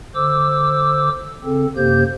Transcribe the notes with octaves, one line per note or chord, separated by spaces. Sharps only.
D3 C5 D6 E6
C#3 C4 A4
F#2 C3 A#3 G4 C5 G6